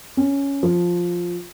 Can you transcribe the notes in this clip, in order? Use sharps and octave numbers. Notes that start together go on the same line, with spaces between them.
C#4
F3